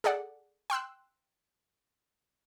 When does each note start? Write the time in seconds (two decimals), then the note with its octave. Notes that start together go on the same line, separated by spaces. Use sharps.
0.04 G#4 A4 D5 F#5
0.70 G5 C6 E6 F#6